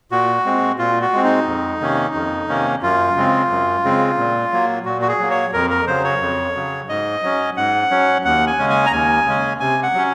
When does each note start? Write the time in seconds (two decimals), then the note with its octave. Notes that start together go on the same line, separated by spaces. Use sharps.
0.11 A#2 F#4
0.45 G#3 C4
0.79 A#2 F4
1.01 F#4
1.13 G#3 C4
1.24 D#4
1.47 F2
1.81 C3 D#3 A#3 C#4
2.14 F2
2.49 C3 D#3 A#3 C#4
2.82 F#2 F4
3.16 C#3 G#3 C4
3.50 F#2
3.84 C#3 G#3 C4
4.18 A#2
4.52 F#3 A#3
4.85 A#2 F#4
5.02 F#4
5.08 G#4
5.20 F#3 A#3
5.31 C#5
5.53 F2 A#4
5.70 A#4
5.87 C#3 F#3 C5
6.04 C#5
6.21 F2
6.55 C#3 F#3
6.89 G#2 D#5
7.23 F#3 C#4
7.57 G#2 F#5
7.91 F#3 C#4
8.25 D#2 F#5
8.47 G#5
8.59 C#3 G#3 C#4
8.70 G#5
8.86 A#5
8.92 D#2 G#5
9.26 C#3 G#3 C#4
9.60 C3 G#5
9.83 F#5
9.94 F#3 C#4